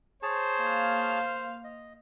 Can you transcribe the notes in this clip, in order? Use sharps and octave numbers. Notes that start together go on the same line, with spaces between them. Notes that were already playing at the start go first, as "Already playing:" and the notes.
G#4 C5 C#5 A5
A#3 F5
D#5